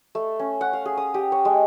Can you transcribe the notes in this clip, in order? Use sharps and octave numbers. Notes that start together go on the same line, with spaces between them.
A3
C#4
F#5
F5
G#4
D#6
G4
C#5
G#3